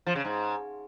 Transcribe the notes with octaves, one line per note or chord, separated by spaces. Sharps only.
F3
C#3
G#2